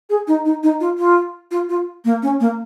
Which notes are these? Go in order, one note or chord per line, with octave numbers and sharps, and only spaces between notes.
G#4
D#4
D#4
D#4
F4
F4
F4
F4
A#3
C#4
A#3